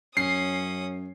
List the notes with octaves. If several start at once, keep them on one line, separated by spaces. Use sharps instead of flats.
F#2 C#4 D#6 C7